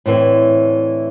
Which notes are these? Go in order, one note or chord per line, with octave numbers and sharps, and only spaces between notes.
A2 D3 E3 C4